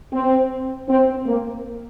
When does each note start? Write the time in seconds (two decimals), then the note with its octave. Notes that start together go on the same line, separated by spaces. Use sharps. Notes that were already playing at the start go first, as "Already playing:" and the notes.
0.13 C4
0.89 C4
1.27 A#3